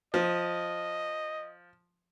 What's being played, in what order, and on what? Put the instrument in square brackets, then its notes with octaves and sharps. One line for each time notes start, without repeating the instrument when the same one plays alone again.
[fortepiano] F3 [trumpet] D#5